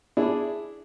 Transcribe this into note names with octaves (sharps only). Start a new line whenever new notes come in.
D4 E4 G#4